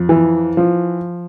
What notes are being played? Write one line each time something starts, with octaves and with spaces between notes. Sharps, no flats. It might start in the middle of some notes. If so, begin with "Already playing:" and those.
Already playing: F2
E3
F3